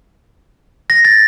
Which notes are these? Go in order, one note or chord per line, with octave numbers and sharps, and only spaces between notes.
A#6
A6